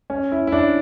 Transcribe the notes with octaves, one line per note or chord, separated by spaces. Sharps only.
C#4
E4
E4
D4